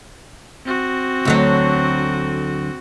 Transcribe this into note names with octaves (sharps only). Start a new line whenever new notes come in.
C4 F#4
D2 D3 F#3